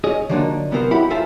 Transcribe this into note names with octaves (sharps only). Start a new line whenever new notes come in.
G#4 C#5 D#5
D3 F3 F#3 A#3 D4 D#4
C3 B3 C4 G4 A#4 C5
G#2 F#3 E4 G4 F#5 B5
D#4 F4 A4 C5 E5 G#5